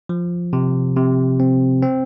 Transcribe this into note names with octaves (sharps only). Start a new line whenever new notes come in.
F3
C3
C3
C4
C4